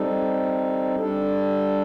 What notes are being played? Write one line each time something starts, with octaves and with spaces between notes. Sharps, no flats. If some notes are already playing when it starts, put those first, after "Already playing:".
Already playing: G3 C4 D#4 A4
G3 D4 A4